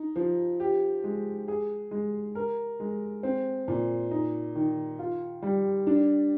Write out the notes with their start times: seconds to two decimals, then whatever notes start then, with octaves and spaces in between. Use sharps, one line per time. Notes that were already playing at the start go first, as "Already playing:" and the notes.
Already playing: D#4
0.16 F3
0.60 G4
1.04 G#3
1.48 G#4
1.91 G#3
2.35 A#4
2.80 G#3
3.23 C4
3.68 A#2
4.11 D#4
4.55 D#3
4.99 F4
5.42 G3
5.87 D4